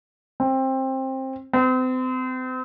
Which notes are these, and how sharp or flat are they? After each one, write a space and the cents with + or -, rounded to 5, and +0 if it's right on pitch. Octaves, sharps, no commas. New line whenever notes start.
C4 +20
C4 -35